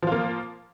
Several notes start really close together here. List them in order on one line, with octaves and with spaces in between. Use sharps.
F3 F4 A#3